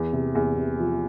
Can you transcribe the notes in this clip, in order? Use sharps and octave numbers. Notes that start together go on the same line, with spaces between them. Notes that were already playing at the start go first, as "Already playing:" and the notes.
Already playing: E2
C3
E2
C3
F3